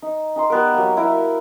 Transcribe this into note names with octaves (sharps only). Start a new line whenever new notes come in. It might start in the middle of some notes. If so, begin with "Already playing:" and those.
D#4
D#4 A#5 C6
G3 B3 A#4
F#3 A#3
E4 A#4